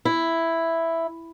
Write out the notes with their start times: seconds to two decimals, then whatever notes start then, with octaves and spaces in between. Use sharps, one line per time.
0.05 E4